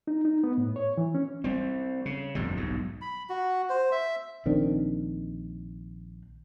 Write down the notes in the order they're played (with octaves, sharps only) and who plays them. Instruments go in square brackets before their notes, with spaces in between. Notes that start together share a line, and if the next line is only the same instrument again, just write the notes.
[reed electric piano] D#4
D#4
B3
A2
C#5
E3
C#4
[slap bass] G3 C4
C#3
G1 F2 A2 G3
B1 G#2
[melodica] B5
F#4
C5
E5
[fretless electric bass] A#1 D#3 C4 D4